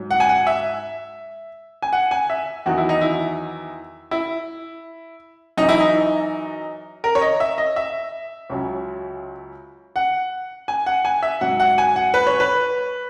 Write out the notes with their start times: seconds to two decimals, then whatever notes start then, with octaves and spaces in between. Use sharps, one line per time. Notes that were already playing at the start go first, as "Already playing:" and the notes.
Already playing: G#2 F#3
0.11 F#5
0.20 G#5
0.29 F#5
0.47 E5
1.82 G#5
1.93 F#5
2.11 G#5
2.30 E5
2.66 E2 D#3 F#3 F#4
2.78 E4
2.89 D#4
3.01 E4
4.11 E4
5.57 F#2 E3 D#4
5.69 E4
5.80 D#4
7.04 A#4
7.15 C#5
7.21 D#5
7.40 E5
7.58 D#5
7.76 E5
8.50 C#2 C#3 F#3
9.96 F#5
10.68 G#5
10.86 F#5
11.05 G#5
11.23 E5
11.41 G#2 F#3 F#5
11.60 F#5
11.78 G#5
11.96 F#5
12.14 B4
12.27 C#5
12.40 B4